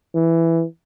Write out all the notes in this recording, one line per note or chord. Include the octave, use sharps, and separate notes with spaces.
E3